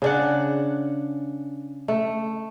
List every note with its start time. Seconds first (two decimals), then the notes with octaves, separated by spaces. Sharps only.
0.02 C#3 D4 F#5
1.88 A3